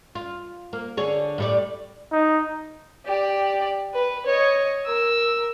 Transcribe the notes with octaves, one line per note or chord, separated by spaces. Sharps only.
F4
A#3
D3 G#4 C#5
A2 G3 D5
D#4
G4 D5
B4
C#5 D#5
A#4 E6